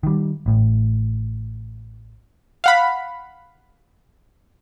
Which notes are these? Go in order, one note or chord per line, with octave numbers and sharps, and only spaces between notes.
D#3 G3
A1 A2
F5 F#5 B5